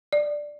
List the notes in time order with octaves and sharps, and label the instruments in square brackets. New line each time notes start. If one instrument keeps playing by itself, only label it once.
[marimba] D5